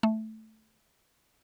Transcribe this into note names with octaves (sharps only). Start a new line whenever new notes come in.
A3